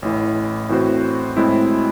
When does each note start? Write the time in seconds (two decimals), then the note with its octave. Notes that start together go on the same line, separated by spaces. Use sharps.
0.02 A1 A2 E3
0.69 A2 E3 C4 F#4 C5
1.37 A2 G#3 C4 E4